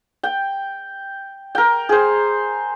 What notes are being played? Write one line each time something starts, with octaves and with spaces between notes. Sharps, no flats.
G5
A#4 G5
G#4 C5